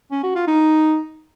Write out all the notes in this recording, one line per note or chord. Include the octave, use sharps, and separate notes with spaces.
C#4
F#4
F4
D#4